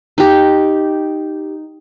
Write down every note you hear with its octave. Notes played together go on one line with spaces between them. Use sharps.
D#4 G4